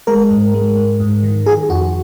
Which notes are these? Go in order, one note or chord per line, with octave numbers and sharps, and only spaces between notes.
G#3 A#4
G#2
G#3
G#2
G#2
D#3
D#3 G#4
F2 F#4